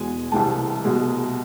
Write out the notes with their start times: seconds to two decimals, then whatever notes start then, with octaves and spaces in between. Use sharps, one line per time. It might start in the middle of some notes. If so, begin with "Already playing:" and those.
Already playing: E2 B2 G#3 G#5
0.32 C2 C3 E3 G#3 G5 A5
0.84 C2 B2 G#3